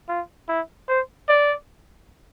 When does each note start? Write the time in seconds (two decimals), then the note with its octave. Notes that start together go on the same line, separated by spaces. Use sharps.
0.09 F4
0.49 E4
0.88 C5
1.29 D5